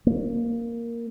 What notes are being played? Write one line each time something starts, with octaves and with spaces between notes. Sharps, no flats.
A#3